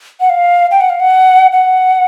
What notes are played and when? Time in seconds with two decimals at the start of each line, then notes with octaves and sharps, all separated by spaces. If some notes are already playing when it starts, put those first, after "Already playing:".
0.20 F#5
0.30 F5
0.71 G5
0.80 F#5
0.90 F5
1.00 F#5
1.52 F#5